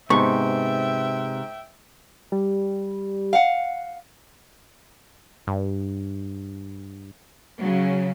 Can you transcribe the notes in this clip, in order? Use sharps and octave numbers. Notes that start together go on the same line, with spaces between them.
G#2 C3 B3 E5 G5 C6 C#6
G3
F5 F#5
G2
C#3 F#3